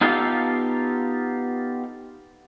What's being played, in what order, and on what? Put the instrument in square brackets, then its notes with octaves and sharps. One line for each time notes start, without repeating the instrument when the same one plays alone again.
[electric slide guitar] B3 D#4 F4 G4 A4 F5